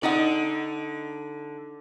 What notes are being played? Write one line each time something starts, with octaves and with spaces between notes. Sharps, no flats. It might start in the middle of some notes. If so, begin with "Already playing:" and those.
D3 D#4 D5 D#5 F#5